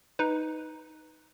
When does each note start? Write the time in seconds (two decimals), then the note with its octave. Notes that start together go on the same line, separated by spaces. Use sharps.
0.19 D#4 B4